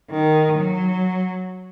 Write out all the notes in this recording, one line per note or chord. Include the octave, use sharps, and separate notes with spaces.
D#3
F#3